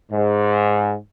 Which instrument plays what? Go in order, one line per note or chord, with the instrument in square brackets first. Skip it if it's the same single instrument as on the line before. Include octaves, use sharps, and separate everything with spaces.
[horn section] G#2